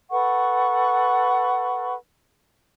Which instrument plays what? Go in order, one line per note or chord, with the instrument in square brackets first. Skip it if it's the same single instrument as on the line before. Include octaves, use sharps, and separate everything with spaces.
[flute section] A4 B4 F#5 C#6